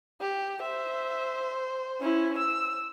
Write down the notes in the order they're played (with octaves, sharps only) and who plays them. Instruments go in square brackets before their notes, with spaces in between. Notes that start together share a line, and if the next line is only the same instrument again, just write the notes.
[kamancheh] G4
[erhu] C5 [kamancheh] E5
[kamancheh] C#4 E4
E6